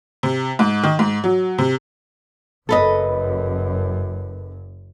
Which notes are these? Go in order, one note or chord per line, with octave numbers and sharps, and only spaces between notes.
C3
G#2
D#3
G#2
F#3
C3
F#1 F#2 A4 B4 D#5